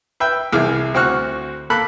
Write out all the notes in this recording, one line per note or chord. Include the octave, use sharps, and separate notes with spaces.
B4 E5 G5
C2 E3 G#4 D6 F6
D2 C4 F#4 C#6 F6 F#6
A#3 A4 B5 F#6